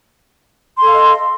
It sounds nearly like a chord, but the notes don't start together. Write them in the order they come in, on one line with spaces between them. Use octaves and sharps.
C6 A4 F5 D#5